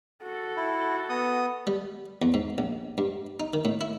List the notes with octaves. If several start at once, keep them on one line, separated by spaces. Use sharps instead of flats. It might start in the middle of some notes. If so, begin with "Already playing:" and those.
F#4 A4
E4
B3 D#6
G3
E2
G#2
A#1
G2
D#4
D#3
A2
E4